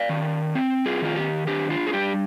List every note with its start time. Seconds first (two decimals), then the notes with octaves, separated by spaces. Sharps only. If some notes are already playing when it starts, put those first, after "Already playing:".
Already playing: D5 F5
0.09 D#3
0.55 C4
0.86 F4 G#4
1.02 D#3 F4
1.16 G4
1.47 D4 G4
1.70 F4
1.87 G#4
1.93 G3 G4